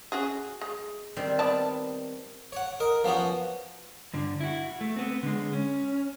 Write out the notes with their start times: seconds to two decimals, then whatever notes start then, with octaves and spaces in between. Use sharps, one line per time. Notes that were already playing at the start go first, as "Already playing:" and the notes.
0.12 C#4 F#4 G#4
0.61 G#3
1.17 D#3 G3 C4
1.39 B3 D5 A5
2.52 C#5 F#5
2.80 A#4 D#5
3.04 F3 B3 C#4 F#4
4.14 G2 D3
4.40 E4 F#4
4.81 A3
4.96 B3 C4
5.23 D3 G#3
5.53 C#4